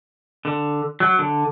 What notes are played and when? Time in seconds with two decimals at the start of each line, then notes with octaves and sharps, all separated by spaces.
0.45 D3
1.00 F#3
1.19 D3